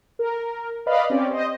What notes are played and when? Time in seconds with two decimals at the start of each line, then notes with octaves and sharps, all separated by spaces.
0.19 A#4
0.86 B4 D5 D#5 F5 B5
1.10 C4 C#4 G4 D5
1.31 C5 D#5